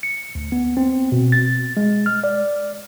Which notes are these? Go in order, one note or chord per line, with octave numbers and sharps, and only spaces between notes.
C#7
D2
B3
C4
B2
A6
G#3
F6
D5